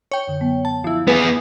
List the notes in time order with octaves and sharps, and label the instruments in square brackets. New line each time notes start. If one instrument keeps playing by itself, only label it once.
[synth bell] C#5 G5
[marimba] F#2 D3
F#3 B3
[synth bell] A5
F3 E4
[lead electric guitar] B3 G#4 [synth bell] B4